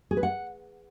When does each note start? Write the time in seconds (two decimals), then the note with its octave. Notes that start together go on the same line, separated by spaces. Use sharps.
0.11 G#4
0.17 B4
0.23 F#5